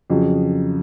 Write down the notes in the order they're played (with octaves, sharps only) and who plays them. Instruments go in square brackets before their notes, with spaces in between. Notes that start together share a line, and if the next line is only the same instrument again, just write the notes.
[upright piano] F2 C#3 F#3